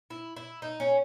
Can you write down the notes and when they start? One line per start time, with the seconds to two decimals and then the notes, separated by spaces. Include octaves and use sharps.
0.10 E4
0.37 E4
0.62 D#4
0.80 C#4